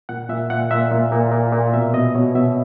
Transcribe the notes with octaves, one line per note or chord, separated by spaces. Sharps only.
A#2 F#5
A#2 E5
A#2 F#5
A#2 E5
A#2
A#2
A#2
A#2
B2 E5
B2 D#5
B2 C#5
B2 E5